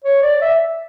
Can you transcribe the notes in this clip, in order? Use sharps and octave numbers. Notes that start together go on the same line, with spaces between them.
C#5
D5
E5